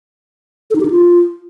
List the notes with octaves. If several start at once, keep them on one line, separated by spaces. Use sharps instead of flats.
A4
D#4
G4
D#4
F4